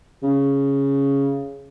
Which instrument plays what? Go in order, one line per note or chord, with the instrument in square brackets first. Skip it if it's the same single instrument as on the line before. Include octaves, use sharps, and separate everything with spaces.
[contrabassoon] C#3